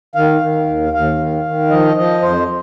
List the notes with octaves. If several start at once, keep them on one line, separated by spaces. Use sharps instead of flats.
D#3 F5
D#3
D#2
D#2 F5
D#3
D#3
F3 D#5
F3 D#5
F2 C5